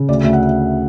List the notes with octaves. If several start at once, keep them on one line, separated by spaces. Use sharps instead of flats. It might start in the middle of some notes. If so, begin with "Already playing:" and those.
Already playing: C#3
D2 D5
D2 E5
F#5